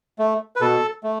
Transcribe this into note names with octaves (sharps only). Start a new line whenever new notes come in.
A3
B4
B2 A4
A3